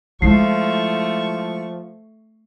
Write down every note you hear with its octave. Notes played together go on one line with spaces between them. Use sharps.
F3 G#3 A3 E4 C#6 C7